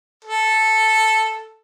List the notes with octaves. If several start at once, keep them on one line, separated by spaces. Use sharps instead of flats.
A4